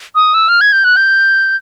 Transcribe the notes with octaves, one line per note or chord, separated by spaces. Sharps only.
D#6
E6
F6
G#6
G6
F#6
G6